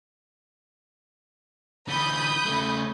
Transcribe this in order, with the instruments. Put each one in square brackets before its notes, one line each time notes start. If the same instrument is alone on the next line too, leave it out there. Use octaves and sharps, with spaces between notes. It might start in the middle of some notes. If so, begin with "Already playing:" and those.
[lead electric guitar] D3 E3 [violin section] B5 D#6 G6
[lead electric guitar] C#3 A3